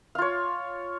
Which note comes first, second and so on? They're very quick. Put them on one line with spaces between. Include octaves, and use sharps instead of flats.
F5 F4 C#5